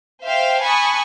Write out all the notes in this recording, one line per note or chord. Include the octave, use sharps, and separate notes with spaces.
C5 E5 F5 G5
G#5 A5 B5 C#6 D#6 F#6